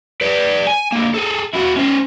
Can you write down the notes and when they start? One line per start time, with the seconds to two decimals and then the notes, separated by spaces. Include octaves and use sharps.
0.21 B4 D5
0.67 G#5
0.93 D3 A#3
1.14 G#4 A4
1.54 E4 F#4
1.77 C#4 C5